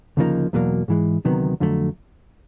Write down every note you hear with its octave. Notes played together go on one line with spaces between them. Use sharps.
D2 C#3 F3 A#3 D#4
E2 B2 F#3 A#3
G#2 E3 G#3
D2 C3 D#3 F#3 B3
F2 D3 F#3 A3